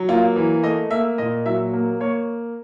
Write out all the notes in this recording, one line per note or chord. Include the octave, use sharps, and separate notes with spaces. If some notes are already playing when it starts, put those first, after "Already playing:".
Already playing: F#3
A#3 F4
E3
A3 D#5
A#3 E5
A#2 D#5
F#3 E5
A#3
A#3 C#5